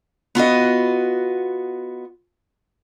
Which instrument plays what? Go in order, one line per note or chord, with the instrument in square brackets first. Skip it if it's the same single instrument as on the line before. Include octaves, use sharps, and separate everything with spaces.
[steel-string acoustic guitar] B3 F4 F#4 D#5